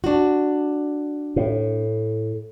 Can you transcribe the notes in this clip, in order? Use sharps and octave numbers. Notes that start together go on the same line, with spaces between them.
D4 F#4
A2